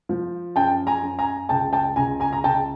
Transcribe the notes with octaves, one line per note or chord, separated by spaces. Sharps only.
F3
F#2 G5 A5
G#5 A#5
F#2
G#5 A#5
C#2 G5 A5
G5 A5
C#2 G#5 A#5
G#5 A#5
A#5
C#2 G5 A5